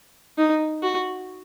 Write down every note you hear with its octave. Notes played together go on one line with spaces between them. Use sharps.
D#4
F#4